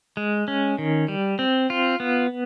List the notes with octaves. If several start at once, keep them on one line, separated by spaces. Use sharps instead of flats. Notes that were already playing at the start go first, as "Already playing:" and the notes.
G#3
C#4
D#3
G3
C4
F4
B3